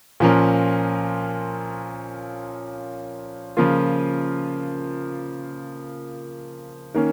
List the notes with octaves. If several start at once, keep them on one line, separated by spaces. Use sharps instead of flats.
A#2 F3 C#4 A#4
C#3 F3 A#3 F4
D#3 A#3 C#4